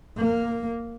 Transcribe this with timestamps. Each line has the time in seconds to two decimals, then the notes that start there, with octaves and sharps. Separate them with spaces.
0.18 A#3